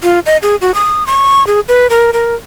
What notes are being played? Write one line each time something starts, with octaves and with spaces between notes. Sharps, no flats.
F4
D#5
G#4
F#4
D#6
C#6
G#4
B4
A#4
A#4